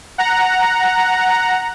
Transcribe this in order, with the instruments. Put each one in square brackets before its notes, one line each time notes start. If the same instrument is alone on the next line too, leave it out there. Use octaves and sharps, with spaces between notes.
[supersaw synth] F#5 A#5